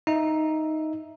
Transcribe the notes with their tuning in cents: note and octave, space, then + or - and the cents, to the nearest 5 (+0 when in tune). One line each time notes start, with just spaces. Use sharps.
D#4 +5 E5 +0